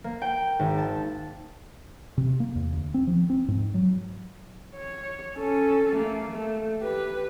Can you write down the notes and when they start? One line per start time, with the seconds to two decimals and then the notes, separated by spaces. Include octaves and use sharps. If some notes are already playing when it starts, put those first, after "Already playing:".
0.04 A#3
0.22 G5
0.59 G#1
0.78 A5
2.18 C3
2.40 A#3
2.55 E2
2.73 D2
2.94 C4
3.07 F3
3.30 C4
3.48 G#2
3.74 F#3
4.75 C#5
5.36 C#4 A4
5.95 A3 A#3
6.31 A3
6.80 G4 B4